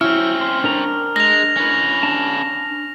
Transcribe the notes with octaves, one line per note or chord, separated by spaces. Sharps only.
F#3 C4 C#4 E4 F6
C6
D4 A#4 A#5
G#3 A#6 F7
C#4 B4
D4 A5